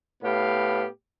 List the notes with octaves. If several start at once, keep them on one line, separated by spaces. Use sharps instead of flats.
A2 B3 G4 F5